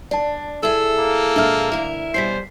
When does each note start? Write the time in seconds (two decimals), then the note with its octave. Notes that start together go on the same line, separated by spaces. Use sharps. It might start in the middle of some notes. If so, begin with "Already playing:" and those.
0.11 D4 D5 A5
0.63 E4 G#4 A4
0.99 A#3
1.36 A#2 G#3 D4 E5 F6
1.72 D2 E4 A#4
2.14 B2 G3 C#4 C5 B6 C7